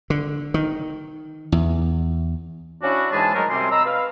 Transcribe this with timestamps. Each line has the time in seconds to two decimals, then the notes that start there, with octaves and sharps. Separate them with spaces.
0.10 D3
0.54 D#3
1.52 E2
2.82 C#4 D4 E4 F#4
3.11 G#2 E3 G#3 G#4 A5
3.34 D#3 F#3 G#3 A3 A#4
3.48 F#2 C3 G3 C4 G#5 C6
3.70 D#5 A#5 B5 E6
3.85 B4 F5